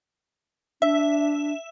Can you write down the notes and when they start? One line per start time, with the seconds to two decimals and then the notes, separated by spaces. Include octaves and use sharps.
0.82 D4 E5